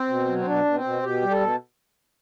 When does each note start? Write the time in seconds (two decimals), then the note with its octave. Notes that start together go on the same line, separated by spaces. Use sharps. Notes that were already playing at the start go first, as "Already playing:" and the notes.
Already playing: C4
0.09 B2
0.27 F#3
0.38 C4
0.46 B2 D4
0.65 B2
0.75 C4
0.84 B2
1.03 B2 G4
1.22 G3
1.31 A4
1.40 B2